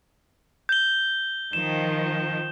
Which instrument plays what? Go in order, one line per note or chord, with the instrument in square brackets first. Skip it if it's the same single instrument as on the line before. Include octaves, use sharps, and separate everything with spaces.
[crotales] G6 G7
[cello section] D#3 F3 [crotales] E7